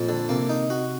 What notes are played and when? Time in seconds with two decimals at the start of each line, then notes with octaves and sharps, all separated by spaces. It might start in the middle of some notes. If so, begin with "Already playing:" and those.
Already playing: F2 A#2
0.09 D3
0.29 C3 A#3
0.49 D#4
0.70 F#4